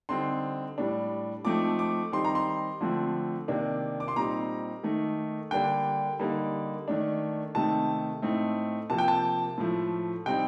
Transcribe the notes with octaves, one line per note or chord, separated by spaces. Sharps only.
D3 G3 C4 D#4 C6
A2 G3 D4
F3 A3 C4 D#4 D6
D6
D#3 G3 C4 D#4 C6
A#5
C6
D3 F3 A3 C4
C3 D#3 A#3 D4
D6
C6
A#2 G3 C4 D#4 A#5
D#3 A3 D#4
D3 G3 A#3 D4 G5
D3 G3 A#3 D#4
D#3 A3 D4
C3 D#3 A3 C4 D#4 A5
A2 A3 C4 D#4
C3 F3 A#3 A5
G5
A5
A2 F3 A3
C3 G3 C4 D#4 G5